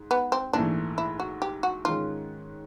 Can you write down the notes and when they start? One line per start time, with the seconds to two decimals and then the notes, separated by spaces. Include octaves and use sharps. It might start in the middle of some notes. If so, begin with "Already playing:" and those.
Already playing: G#2
0.11 B3
0.32 C4
0.53 A#1 G#2 E3 A3 D4
0.98 E4
1.20 F#4
1.42 G4
1.63 F#4
1.85 G#2 D#3 G#3 C#4 F4